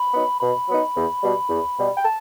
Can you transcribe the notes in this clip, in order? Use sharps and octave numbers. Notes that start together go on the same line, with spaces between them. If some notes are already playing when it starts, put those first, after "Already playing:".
Already playing: B5
F#3 B3 D#4
B2 B5
F#3 B3 D#4
E2
B2 G3
E2
B2 G3
G5
A5